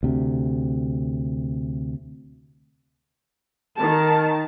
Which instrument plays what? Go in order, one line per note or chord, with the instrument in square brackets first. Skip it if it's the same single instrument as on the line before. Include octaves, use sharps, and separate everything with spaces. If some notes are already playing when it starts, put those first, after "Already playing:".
[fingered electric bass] D2 C3
[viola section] D#3 A5